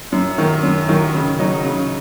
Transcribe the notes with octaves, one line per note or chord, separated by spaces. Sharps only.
F#2
D#3 F#3
F#2
D#3 F#3
C#3
F#3 D#4
C#3